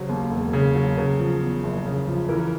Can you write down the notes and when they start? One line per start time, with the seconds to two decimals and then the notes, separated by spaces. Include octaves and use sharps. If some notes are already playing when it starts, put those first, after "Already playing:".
Already playing: C#3 F#3 C5
0.09 D#2
0.31 E1
0.53 C#3
0.75 F#3
0.97 C#3 A#4
1.19 F3
1.41 E2
1.64 F#1
1.86 C#3
2.07 F3
2.29 E3 A#4